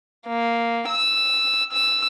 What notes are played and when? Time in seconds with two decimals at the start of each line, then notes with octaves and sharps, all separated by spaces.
0.27 A#3
0.88 E6
1.73 E6